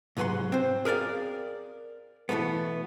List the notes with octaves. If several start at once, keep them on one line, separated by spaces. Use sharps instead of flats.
C2 G#2 F#3 B4 F#5 C6
C4 C5
G#4 A#4 B4 D5 F5
B2 D3 E3 A3 B3